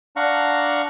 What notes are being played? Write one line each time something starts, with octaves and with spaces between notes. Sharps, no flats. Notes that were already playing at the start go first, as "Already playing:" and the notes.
D4 F5 F#5 A#5 C#6